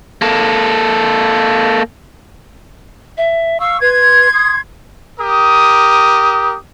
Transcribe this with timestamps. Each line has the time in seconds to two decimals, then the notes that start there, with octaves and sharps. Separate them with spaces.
0.22 A#3 A4
3.17 E5
3.60 F5 C#6 E6
3.81 B4 C6 G#6
4.33 D#6
5.19 G4 A#4 D#6